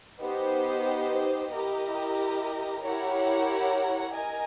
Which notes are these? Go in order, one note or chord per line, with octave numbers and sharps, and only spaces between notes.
B3 D#4 G4 C5 D#5
E4 G4 A#4 D#5
E4 G4 A#4 C#5 F#5
A#4 D#5 G#5